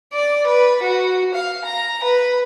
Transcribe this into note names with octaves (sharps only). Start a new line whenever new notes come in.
D5
B4
F#4
F5
A#5
B4